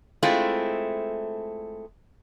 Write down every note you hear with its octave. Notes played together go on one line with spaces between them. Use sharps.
G#3 A3 C4 E4 F4